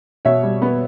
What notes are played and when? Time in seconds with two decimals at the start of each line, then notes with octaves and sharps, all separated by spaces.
0.25 B2 C#5 E5
0.43 G3
0.62 B3